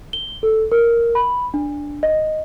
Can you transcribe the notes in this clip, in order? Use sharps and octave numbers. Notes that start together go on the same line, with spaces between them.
G7
A4
A#4
B5
D4
D#5